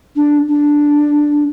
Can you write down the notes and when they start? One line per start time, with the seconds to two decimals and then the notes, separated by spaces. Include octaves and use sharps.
0.16 D4
0.49 D4